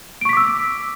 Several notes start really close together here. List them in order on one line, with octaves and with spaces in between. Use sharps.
D7 C#6 B6 D6 E6